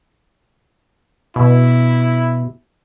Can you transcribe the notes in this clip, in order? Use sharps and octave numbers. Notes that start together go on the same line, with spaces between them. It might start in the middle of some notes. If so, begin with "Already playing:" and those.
B2 E4